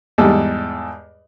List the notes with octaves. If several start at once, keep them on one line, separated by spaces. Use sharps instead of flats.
E2 G#2 G3 A4